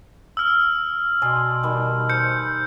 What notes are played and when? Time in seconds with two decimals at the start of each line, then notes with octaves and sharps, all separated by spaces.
0.37 E6 F6
1.22 B2 D5 G#5 C6
1.63 D#3 G3
2.09 C5 G6 C#7